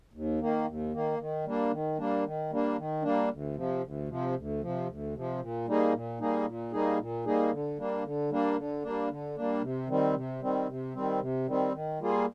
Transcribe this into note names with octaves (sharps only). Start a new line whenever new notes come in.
D#2
D#3 A#3
D#2
D#3 A#3
D#3
G3 A#3 D4
D#3
G3 A#3 D4
D#3
G3 A#3 D4
D#3
G3 A#3 D4
D2
C3 F3
D2
C3 F3
D2
C3 F3
D2
C3 F3
A#2
G3 A#3 D#4 G#4
A#2
G3 A#3 D#4 G#4
A#2
G3 A#3 D#4 G#4
A#2
G3 A#3 D#4 G#4
D3
G3 A#3 D4
D3
G3 A#3 D4
D3
G3 A#3 D4
D3
G3 A#3 D4
C3
D#3 G3 C4
C3
D#3 G3 C4
C3
D#3 G3 C4
C3
D#3 G3 C4
D#3
G3 A#3 F4 G#4